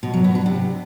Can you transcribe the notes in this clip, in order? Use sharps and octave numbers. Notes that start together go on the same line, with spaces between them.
B2
F#3
B3
D4
C3